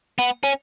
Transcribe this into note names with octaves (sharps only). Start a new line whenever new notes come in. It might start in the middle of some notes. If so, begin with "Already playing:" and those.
B3
C#4